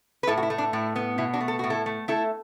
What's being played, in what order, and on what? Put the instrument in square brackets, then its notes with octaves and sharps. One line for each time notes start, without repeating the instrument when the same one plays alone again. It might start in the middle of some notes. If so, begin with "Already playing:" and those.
[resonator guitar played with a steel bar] B4
A2 E4 A4
F#4
E4
A3
D4
A2 E4
B3
B2 E4
D4 F#4
A3
A4
A2 F#4
E4 A4
A3
A3 E4 A4